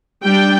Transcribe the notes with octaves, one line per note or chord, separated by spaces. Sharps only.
G3 D4 G5